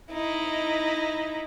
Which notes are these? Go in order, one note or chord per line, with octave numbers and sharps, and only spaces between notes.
D#4 E4